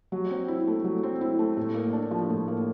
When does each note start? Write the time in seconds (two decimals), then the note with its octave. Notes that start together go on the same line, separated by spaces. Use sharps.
0.12 F#3
0.31 C4
0.48 E4
0.67 A3
0.84 F#3
1.03 C4
1.21 E4
1.39 A3
1.57 A2
1.75 A#3
1.93 D4
2.11 F3
2.30 A2
2.48 A#3